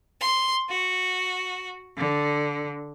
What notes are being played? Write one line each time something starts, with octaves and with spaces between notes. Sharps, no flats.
C6
F#4
D3